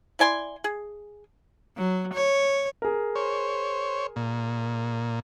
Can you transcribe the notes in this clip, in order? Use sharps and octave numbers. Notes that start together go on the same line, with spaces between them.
E4 D5 G#5 C6
G#4
F#3
C#5
G#4 A#4
C5 C#5
A#2